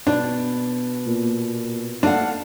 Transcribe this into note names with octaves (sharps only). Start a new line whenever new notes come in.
B2 D4
A#2
A3 D4 F5 F#5